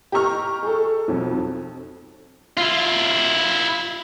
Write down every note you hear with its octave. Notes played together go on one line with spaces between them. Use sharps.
G4 D#5 A#5 C#6 F6
G#4 A4
B1 F2
E4 F4